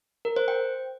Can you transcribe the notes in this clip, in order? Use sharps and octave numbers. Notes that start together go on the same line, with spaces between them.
A#4
C5
G5